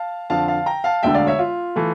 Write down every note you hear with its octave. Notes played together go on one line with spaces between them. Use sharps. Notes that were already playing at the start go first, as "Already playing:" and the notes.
Already playing: F5 A5
F2 D3 F3 F5 A5
F5 A5
G5 A#5
F5 A5
E1 D2 D3 E5 G5
D5 F5
C#5 E5
F4
E3 A3